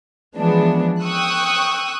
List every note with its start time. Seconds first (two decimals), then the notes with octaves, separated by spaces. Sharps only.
0.36 E3 F3 G#3 B3 D4
1.02 G5 C#6 D#6 E6 F#6